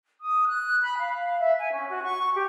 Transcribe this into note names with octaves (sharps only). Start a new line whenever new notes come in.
D#6
F#6
B5
F5
F5
E5
G#5
C#4
F#4
C#6
G4